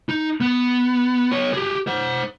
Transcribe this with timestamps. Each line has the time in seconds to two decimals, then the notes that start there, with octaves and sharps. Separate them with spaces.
0.09 D#4
0.41 B3
1.32 B3 C#5
1.53 G4 G#4
1.87 C5 F#5